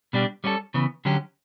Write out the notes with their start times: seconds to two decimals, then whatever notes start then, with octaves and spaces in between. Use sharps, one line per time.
0.13 B2 G3 D4 G4
0.44 G3 C#4 F#4 A4
0.74 C#3 E3 B3
1.05 D3 F#3 C#4 G4